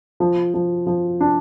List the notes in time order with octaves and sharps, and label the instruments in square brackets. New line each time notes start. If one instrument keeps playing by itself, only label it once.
[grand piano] F3
F3
F3
D4